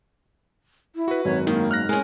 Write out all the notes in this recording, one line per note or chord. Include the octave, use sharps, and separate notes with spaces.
E4
F#4 B4
G#1 F#2 C#5
G#2 D#3 A#3
F6 F#6 A#6
G#3 C#4 A#4 G#5